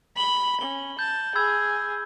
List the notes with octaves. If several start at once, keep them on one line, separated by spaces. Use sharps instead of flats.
B5 F#7 G7
C#4 G7
A5 G6
G#4 B5 E6 G#6